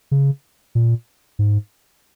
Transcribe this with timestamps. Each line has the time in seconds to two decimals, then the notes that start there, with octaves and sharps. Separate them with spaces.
0.11 C#3
0.75 A#2
1.39 G#2